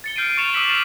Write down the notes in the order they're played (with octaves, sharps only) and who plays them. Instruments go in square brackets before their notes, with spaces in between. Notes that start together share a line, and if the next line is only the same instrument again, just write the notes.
[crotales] A6 C#7 G7
F6 G6 C7 D7 D#7
C#6 A6 C#7 E7 F7
D6 E6 B6 F#7
F6 A6 C7 C#7 E7 F7